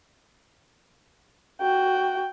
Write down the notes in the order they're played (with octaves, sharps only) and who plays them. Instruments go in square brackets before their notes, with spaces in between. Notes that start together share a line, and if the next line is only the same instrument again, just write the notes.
[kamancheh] F#4 G5